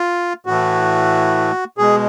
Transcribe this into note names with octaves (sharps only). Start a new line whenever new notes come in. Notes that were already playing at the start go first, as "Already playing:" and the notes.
Already playing: F4
A2 E3 A3 F#4
B2 G#3 G#4